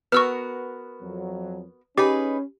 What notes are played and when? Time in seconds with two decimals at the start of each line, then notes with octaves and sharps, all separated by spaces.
0.12 B3 F#4 A#4 B4 C#6 E6 F6
1.03 F2 F#3
1.98 C#4 D#4 G4 G#4 B4